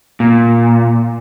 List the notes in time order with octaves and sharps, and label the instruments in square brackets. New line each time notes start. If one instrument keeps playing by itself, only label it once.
[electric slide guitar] A#2